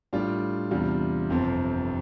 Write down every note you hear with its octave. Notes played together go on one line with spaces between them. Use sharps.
A2 G3 D4 F4
E2 C3 G3 D4 F4
G1 F2 C3 F3 C4